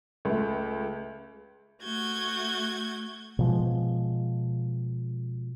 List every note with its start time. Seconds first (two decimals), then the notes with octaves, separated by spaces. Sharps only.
0.25 C#2 A3
1.83 A3 F#4 G6 G#6
3.39 B2 F3 G#3